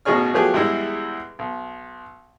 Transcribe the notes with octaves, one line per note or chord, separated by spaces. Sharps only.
A1 B2 D#4 G#4 C#5 F6
F3 F#3 A3 B3 G4 G#4
E2 G3 G#3 E4 E5
B1